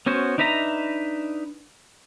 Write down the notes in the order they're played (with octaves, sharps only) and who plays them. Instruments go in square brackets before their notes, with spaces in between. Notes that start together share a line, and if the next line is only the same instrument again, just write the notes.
[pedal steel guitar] B3 C#4 F#4 C5
D4 D#4 B4 E5 A#5